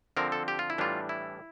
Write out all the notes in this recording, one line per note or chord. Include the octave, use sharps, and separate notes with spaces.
D3 F3 C4 A#4
A4
G4
F4
E4
A2 E3 G3 D4 F4
E4